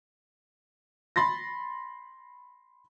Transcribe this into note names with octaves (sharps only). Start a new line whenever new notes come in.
B5 C6 A6 A#6